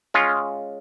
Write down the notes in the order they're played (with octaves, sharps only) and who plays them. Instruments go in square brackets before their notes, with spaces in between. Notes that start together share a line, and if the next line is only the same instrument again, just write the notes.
[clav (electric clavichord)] G#3 C#4 F4